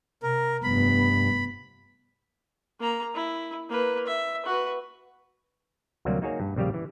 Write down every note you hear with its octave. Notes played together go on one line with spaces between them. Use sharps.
C3 A#4
F1 G2 B3 B5
A#3 A#5
E4
A#3 B4
E5
F#4 B4
D2 C3 F#3 G3 A#3
A#3 D#4 F#4 G#4 C#5
G2
A#1 C#3 G3 G4 F5
E3